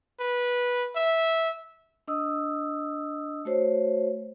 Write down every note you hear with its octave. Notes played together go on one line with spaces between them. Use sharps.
B4
E5
D4 D#5 D#6 E6
A3 F#4 C5 C#5